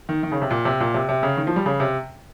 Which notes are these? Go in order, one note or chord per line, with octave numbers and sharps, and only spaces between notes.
D#3
D#3
C#3
C3
A#2
C3
A#2
C3
C3
C#3
D#3
F3
G3
C#3
C3